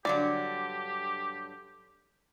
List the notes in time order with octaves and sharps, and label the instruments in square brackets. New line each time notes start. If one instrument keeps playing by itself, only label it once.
[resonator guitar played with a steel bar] G2 D3 F#3 [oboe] G4 [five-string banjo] D5